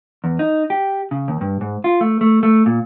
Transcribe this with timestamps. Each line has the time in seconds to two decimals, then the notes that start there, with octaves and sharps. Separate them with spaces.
0.24 E2
0.39 D#4
0.70 G4
1.11 C#3
1.28 D#2
1.41 G2
1.61 G#2
1.84 F4
2.01 A3
2.21 A3
2.43 A3
2.66 A#2